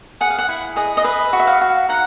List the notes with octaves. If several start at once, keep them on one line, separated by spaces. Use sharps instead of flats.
G#4 F#5
F5
F#5
E4
G#4 D#5
D#5
B4 E5
F#4
E5
F5
F#4
D#4 F#5